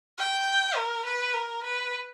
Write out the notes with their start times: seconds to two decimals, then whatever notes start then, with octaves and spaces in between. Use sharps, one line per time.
0.19 G5
0.76 A#4
1.05 B4
1.34 A#4
1.63 B4